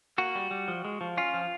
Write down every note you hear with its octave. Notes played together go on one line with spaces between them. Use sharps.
A#3 F#4
G3
G3
F3
G#3
F3
C#4 F4
F3